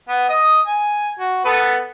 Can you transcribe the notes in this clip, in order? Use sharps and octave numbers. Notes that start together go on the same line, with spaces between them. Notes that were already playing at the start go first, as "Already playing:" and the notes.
B3
D#5 D#6
G#5
F#4
B3 A4 B4